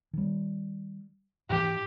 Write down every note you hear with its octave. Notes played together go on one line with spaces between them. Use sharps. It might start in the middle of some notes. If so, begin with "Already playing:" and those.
D#3 G3
G#2 E3 G4